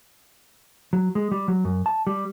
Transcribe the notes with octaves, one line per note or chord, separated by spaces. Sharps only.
F#3
G#3
G3
F#3
F#2
A5
G3